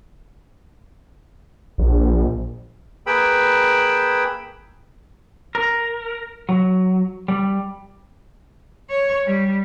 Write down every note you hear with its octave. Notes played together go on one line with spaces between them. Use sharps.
A#1
A#3 G#4 B4 G5 B5 E6
A#4
F#3
G3
C#5
G3